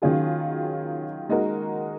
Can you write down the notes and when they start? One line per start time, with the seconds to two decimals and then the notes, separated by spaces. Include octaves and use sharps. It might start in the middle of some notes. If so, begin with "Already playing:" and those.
0.02 D#3 F#3 C#4 F4 G#4
1.29 G#3 D#4 F#4 A#4